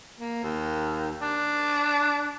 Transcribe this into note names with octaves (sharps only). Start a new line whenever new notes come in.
A#3
D#2
D4